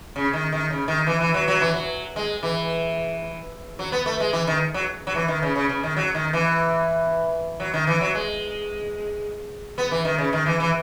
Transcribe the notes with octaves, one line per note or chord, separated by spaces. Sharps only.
C#3
D#3
D#3
C#3
D#3
E3
E3
F#3
F#3
E3
F#3
G#3
E3
F#3
B3
A3
G#3
E3
D#3
F#3
F#3
E3
D#3
C#3
C#3
C#3
D#3
F#3
D#3
E3
F#3
D#3
E3
F#3
G#3
B3
E3
D#3
C#3
D#3
E3
E3